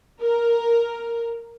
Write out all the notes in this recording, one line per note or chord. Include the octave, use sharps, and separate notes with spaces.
A#4